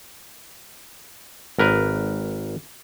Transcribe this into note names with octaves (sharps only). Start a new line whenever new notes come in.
G#1 A#4 B4